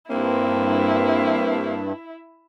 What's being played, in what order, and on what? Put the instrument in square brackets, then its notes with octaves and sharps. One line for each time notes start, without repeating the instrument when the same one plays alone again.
[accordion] G2 [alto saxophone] A#3 [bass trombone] C4 [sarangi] E4